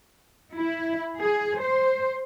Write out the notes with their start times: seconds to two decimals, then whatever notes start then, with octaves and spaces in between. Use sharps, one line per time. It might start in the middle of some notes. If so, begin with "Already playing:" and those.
0.56 E4
1.20 G#4
1.60 C5